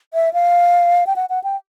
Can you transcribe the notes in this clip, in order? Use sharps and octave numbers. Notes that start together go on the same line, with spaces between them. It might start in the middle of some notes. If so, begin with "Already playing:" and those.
E5
F5
G5
F#5
F#5
G5